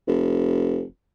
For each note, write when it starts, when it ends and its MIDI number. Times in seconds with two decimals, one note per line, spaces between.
0.07 0.82 29